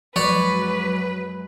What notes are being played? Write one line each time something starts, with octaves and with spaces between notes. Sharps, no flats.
F#2 F3 F#3 G#3 B4 C#5 D5